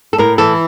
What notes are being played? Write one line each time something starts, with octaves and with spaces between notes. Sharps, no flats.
A4
A2 A#4
E3 A4